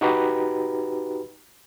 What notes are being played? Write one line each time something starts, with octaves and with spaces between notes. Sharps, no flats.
D#4 F#4 G4 B4 A#5